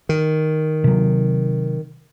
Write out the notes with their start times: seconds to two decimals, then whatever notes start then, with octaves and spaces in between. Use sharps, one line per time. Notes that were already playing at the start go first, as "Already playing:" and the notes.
0.09 D#3
0.84 C3 F#3